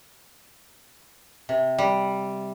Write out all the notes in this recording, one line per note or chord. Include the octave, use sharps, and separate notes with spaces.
C3
G3